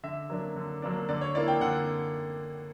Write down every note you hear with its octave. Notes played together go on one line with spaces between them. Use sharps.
D3 E5
F#3 A#3 D4
D3
F#3 A#3 D4
D3 D5
C#5
A#3 E4 D5
G5
D3 F#5